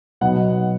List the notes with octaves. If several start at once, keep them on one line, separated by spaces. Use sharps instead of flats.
B2 F#3 B3 D#4 F#5